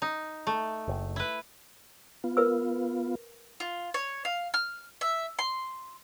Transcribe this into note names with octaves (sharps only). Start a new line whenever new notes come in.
D#4
A3
F#1
E4 B4
B3 F4
A#4 B4 E6
F4
C#5
F5
F6
E5
C6